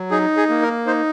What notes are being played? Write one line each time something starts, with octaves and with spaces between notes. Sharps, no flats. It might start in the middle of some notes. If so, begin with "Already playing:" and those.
Already playing: F#3
D#4 G#4
G#4
A#3
A#4
D#4 C5